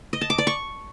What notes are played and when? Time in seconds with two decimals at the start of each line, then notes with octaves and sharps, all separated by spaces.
0.13 D#5
0.21 A5
0.30 D6
0.38 D5
0.47 C#6